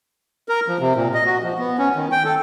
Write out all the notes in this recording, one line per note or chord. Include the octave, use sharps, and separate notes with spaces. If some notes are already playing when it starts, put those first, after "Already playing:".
A#4
F3
C3
A#2
D#5
F#4
F3
B3
C#4
D#3
G5
A4